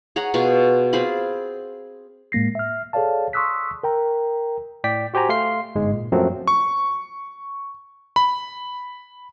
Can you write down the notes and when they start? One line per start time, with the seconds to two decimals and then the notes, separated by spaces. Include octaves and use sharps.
0.16 G#4 C#5 F#5 A#5
0.34 B2 F4 G#4 C#6
0.93 C4 F4 G#4 B5
2.32 A2 G#3 A#3 A#6 C7
2.55 E5 F6
2.93 G#4 A4 C#5 D5 F5 A5
3.33 C6 C#6 D#6 E6 F#6 B6
3.83 A#4 G5 A#5
4.84 A2 D5 G5 B6
5.14 F#4 G4 C5 G#5 A#5
5.29 A3 F5 C6 C7
5.75 G1 G#2 G#3
5.93 A#2
6.12 F#2 F3 F#3 A3 A#3 C4
6.47 C#6
8.16 B5